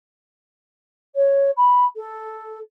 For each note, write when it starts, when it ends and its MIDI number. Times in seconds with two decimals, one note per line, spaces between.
1.15 1.50 73
1.57 1.84 83
1.96 2.58 69